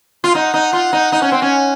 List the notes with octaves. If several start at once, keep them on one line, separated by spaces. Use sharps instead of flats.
F4
D#4 F#5
D#4
F4
D#4
D#4
C#4
C4
C#4